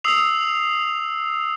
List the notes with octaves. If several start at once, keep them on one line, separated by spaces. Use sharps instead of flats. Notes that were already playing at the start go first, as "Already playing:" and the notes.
D#6 E6 C7 F7